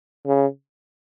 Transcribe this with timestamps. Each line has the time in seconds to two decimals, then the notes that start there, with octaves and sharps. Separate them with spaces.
0.26 C#3